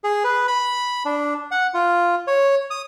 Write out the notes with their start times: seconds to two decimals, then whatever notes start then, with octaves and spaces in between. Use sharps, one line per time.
0.04 G#4
0.24 B4
0.48 B5
1.05 D4
1.51 F#5
1.74 F4
2.27 C#5
2.70 D#6